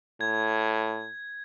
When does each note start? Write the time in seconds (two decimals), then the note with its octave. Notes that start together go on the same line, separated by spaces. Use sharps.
0.21 A2 G#6